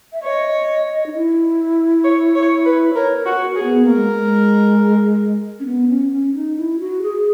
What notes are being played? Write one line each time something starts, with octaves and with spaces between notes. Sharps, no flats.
E5
C#5 D#5
D#4
E4
C#5
C#5
B4
A#4 C#5
A#4
F#4
F#4
G#4
B3
A#3 A#4
G#3
G#3
C#4
B3
C#4
C#4
D#4
E4
F#4
G#4